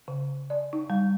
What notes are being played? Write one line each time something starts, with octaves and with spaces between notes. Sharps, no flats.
C#3
D5
D#4
G3